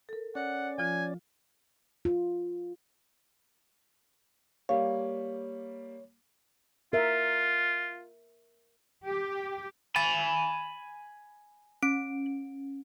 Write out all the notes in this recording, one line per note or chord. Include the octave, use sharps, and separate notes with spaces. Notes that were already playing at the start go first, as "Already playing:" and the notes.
A4 A#4
C#4 D5 F#5
F3 F4 G#5
F4
G3 A#3 C#5 F5
F4 A#4 E5
G4
G#5 B5 A6
C#4 D7